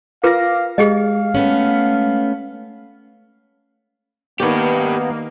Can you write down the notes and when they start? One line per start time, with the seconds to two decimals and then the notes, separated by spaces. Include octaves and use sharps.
0.24 F4 A#4 B4 F5 D6 A#6
0.78 G#3 G4 G#4 D#5 F5
1.35 A3 B3 C#4
4.40 D#3 A#3 B3 G4 B4 C#5 D5